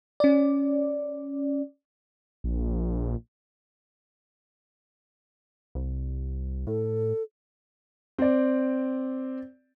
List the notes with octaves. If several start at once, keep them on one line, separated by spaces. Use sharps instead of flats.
C#4 D5
A#1
C2
A2 A4
C4 D5